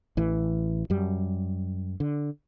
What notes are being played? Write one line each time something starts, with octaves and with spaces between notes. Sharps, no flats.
A1 E3
F#2 G3
D3